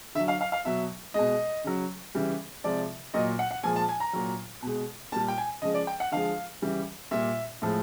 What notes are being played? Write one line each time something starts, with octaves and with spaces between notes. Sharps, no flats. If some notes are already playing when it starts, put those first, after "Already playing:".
D3 F#3 E5
F5
F5
F5
B2 F#3 E5
B2 G#3 D#5
C#3 F#3
C#3 E3 G3
C3 F3 G#3 D5
A#2 F#3 D#5
F#5
F#5
A#2 F3 G#3 G#5
A5
G#5
A#5
A#2 F#3
B2 G#3
A#2 G3 A5
G5
G#5
C#3 F3 G#3 D#5
D5
G5
F#5
D3 F3 G#3 F5
C#3 E3 G3
A#2 G3 E5
A2 F3 G#3